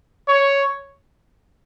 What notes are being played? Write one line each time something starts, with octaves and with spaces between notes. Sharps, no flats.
C#5